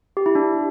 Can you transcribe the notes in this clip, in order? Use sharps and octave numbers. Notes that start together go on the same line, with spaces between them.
G4
E4
D4